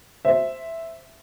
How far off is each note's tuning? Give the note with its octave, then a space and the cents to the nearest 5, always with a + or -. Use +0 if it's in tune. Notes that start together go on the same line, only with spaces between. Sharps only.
C5 +0 E5 +0